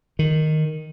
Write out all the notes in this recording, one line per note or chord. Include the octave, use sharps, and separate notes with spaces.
D#3